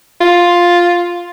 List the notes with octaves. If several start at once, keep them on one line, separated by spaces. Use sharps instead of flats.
F4